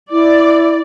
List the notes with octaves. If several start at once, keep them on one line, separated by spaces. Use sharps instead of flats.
E4 D5